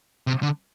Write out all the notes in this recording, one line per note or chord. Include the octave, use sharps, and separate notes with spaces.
C3
D3